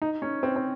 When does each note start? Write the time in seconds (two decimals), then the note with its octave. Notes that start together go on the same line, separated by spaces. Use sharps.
0.02 D#4
0.22 C#4
0.43 C4
0.56 C4